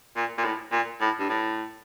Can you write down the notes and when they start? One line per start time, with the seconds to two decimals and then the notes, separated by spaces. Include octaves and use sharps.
0.16 A#2
0.38 A#2
0.44 A2
0.72 A#2
1.01 A2
1.19 G2
1.29 A2